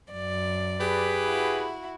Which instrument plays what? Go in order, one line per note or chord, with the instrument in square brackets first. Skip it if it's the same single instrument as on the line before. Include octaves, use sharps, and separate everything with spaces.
[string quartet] F#2 D5
[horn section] G4 G#4 B4
[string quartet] E4 F#4